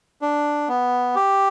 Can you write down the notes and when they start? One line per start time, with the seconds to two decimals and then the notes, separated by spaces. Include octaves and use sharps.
0.22 D4
0.68 B3
1.15 G4